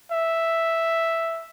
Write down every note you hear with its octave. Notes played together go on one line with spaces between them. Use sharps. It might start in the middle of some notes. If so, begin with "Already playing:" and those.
E5